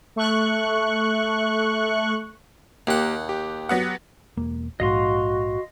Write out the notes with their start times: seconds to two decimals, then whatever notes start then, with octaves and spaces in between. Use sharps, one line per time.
0.16 A3 C#6 F#6
2.87 D#2 A#3 G4 F#5
3.29 G4
3.69 F#3 B3 F#5
4.37 E1 A#3
4.80 A#1 G#2 F#4 D#5 F5 C6